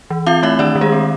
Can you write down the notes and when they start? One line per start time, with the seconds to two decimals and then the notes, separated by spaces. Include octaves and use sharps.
0.10 E3
0.26 C4 F4 F5
0.43 A3 E4 E5
0.59 D#3 D4 D5
0.75 D#3
0.81 G#3 G#4
0.92 C4